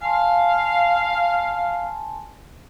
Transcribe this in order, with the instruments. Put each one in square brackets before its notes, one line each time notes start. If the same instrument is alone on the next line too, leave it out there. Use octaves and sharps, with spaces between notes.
[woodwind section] F5 [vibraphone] G#5 A5 C6